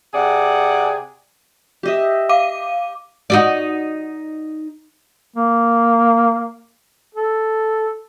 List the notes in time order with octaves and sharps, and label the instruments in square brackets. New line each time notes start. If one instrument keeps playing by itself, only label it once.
[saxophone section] C3 G#4 D5 F#5
[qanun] G4 D#5 E5
[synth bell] F5 D6 D#7
[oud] D#4 F#4 D5
[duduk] A#3
A4